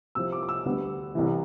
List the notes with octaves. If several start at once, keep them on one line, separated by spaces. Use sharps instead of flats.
C2 C3 F3 E6
D6
D6
E6
D2 D3 G3 B3
C2 C3 E3